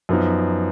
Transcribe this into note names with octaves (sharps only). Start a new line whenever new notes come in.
F#2 F3 B3 D#4